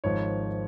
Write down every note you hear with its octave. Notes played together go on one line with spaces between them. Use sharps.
G#1 G#2 F3 C#5